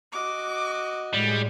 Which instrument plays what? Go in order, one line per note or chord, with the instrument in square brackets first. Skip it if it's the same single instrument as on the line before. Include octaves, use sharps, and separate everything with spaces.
[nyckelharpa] F#4 D#5 [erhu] D6
[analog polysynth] A2 G#3 [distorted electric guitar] G3